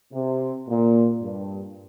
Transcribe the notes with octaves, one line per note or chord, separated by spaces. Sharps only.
C3
A#2
G2